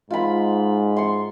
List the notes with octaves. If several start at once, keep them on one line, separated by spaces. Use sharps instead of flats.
G#2 F4 B5
C6 C#6